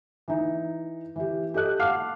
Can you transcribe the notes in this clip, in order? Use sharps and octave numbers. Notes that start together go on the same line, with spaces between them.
E3 D#4
E3 G4
G4 A4 D#5 F#6
F5 F#5 A5 D6 F6 C7